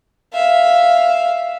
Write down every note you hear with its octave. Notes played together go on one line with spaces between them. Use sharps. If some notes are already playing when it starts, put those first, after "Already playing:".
E5 F5